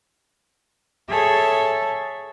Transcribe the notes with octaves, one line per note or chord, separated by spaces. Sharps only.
G#4 A4 C#5 E5 A5